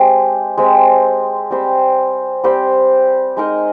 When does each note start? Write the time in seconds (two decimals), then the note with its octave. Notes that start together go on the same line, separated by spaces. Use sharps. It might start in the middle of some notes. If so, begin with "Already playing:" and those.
Already playing: G#3 C4 G4
0.58 G#3 C4 G4
1.51 G3 C4 G4 C5
2.44 G3 C4 G4 C5
3.37 G#3 D#4 A#4 D#5